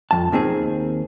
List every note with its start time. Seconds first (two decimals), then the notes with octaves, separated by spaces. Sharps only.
0.11 F2 A5
0.32 D#2 D#3 C4 G#4